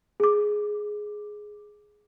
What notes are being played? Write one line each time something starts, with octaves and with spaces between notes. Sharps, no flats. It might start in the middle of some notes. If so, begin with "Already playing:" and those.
G#4 D6